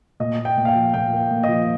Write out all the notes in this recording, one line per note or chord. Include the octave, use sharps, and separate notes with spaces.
A#2 D#5
A#3
G5
A#2
F5
G5
F3
A#2 G5
A#3
A#2
D#5
F3